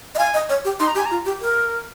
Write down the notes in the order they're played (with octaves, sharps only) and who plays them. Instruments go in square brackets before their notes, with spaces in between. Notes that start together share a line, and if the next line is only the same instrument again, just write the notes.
[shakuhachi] D#5
[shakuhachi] F5 [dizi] G#5
[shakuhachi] D#5
C#5
G4
[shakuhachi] D#4 [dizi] C6
[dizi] A#5
[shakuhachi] G4 [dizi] G#5
[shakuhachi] F4 [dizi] A#5
[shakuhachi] G4
A#4